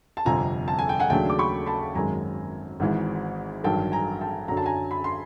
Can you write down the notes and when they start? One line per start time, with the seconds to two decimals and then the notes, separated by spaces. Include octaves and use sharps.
0.17 A5
0.25 G1 F2 C3 F3 G#5 A#5
0.68 A5
0.79 G#5
0.89 G5
1.00 F#5 G#5
1.10 D#2 C#3 F#3 A3 D4 G5 A5
1.30 D6
1.39 B5 C#6
1.66 A5 B5
1.95 G#1 F#2 D#3 G#3 G#5 A#5
2.80 G#1 G#2 E3
3.64 A1 G2 D#3 F#3 G5 A5
3.92 G#5 A#5
4.21 G5 A5
4.48 F#2 D3 F#3 A#5
4.57 A5
4.66 G#5 A#5
4.91 B5
5.04 C6